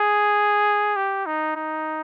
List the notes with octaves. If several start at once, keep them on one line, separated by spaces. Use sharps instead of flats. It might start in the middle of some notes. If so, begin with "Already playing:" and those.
Already playing: G#4
G4
D#4
D#4